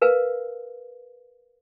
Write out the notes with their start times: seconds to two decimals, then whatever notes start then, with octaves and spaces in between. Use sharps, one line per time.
0.02 A#4 B4 F5 G#5